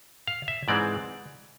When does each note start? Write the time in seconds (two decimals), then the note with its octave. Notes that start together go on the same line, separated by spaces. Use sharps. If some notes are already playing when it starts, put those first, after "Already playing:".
0.27 F5
0.48 E5
0.68 G#2 E3 G#3 C4 D5